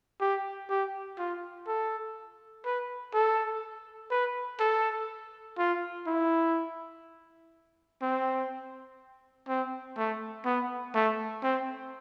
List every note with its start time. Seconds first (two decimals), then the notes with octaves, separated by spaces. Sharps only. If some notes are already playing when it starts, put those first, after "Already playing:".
0.20 G4
0.70 G4
1.19 F4
1.67 A4
2.65 B4
3.14 A4
4.11 B4
4.60 A4
5.58 F4
6.07 E4
8.02 C4
9.48 C4
9.97 A3
10.45 B3
10.94 A3
11.43 C4